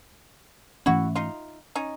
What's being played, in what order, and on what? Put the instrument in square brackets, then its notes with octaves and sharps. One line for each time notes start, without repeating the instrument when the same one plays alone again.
[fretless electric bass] G#2 E3 A3 C#4 [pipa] E4 F#4
[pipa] D#4 F4
C#4 D#4